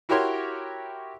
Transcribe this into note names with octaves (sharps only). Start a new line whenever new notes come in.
E4 F#4 G4 A#4 C#5 C6